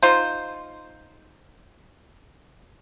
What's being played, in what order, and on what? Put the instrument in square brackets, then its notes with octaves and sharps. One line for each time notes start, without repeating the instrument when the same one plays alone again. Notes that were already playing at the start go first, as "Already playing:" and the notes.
[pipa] D#4 F4 C5